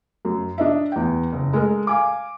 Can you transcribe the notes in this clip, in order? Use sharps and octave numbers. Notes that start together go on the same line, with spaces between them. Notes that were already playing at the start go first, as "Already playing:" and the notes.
F#2
D4 D#5 E5
E2 G5
F#1
G#3 A4 A#4
F5 G#5 D6